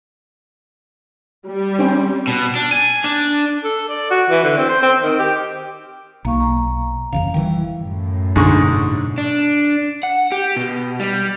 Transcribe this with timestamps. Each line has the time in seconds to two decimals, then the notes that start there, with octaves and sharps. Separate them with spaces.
1.47 G3
1.79 C4 C#4 G5
2.27 B2
2.55 D4
2.73 G#5
3.04 D4
3.64 A4
3.89 D5
4.11 F#4
4.30 E3
4.44 D3
4.57 C4
4.70 C5
4.82 C4
5.02 D#3
5.19 G4
6.25 B1 A#3 F5 C#6
6.40 A#5
7.13 F#1 E2 C#3 F5
7.34 D#3 E3 G3
7.81 F#2 A2
8.36 G#2 B2 D3 C#6
9.18 D4
10.03 F#5
10.32 G4
10.57 B2
11.00 G3